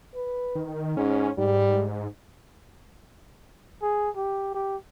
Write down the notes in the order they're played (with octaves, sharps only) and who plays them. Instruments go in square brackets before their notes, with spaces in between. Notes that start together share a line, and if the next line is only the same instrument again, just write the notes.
[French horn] B4
[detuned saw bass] D#3
[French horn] G#2 [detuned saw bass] C#4
[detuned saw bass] G#2 [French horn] G3
[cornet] G#4
G4
G4